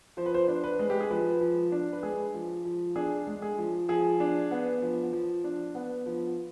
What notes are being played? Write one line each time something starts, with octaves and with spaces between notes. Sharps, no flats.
F3 C5
B4
C5
D4
B4
G#3
G4
G#4
F3 B4
F3
D4
B4
G#3 G#4
F3
F3
D4 G#4
G#3
G#4
F3
F3 G#4
D4
B3
F3
F3
D4
B3
F3